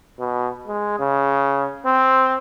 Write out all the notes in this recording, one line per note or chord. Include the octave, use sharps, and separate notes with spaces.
B2
G#3
C#3
C4